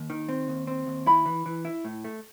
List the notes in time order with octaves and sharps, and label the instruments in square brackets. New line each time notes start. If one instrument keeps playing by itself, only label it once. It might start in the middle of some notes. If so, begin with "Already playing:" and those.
Already playing: [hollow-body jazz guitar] D#2
D#3
C4
D#2
C4
D#2
[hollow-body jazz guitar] E4 [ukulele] B5
[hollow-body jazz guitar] E3
E3
E4
A2
A3